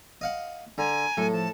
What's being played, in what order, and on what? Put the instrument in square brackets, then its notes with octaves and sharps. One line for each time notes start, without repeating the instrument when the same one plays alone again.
[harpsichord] D#5 F5 F#5
[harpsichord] D3 [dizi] G#5 [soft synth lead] A#5
[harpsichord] A2 [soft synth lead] F#3 [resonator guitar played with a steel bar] A4
[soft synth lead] F3 [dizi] A5